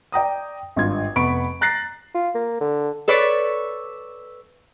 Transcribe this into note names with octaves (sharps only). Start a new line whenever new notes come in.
D5 G5 A#5 D#6
G#1 G2 F4 G#6
F1 B3 B5 C#6 D7
A#5 F#6 A6 A#6 C7
F4
A#3
D3
A4 B4 C#5 D5